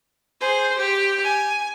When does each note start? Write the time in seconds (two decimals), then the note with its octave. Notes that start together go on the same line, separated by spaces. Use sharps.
0.40 G#4 C5
0.78 G4
1.23 G#5